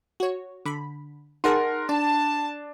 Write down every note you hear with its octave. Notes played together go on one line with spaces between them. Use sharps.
F#4 C#5
D3 B5
D#4 G#4 A#4 F#5 A5 C6
D4 D5 A5